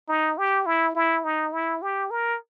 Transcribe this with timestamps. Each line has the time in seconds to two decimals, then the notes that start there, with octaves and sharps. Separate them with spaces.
0.09 D#4
0.38 G4
0.66 E4
0.95 E4
1.24 D#4
1.53 E4
1.82 G4
2.11 A#4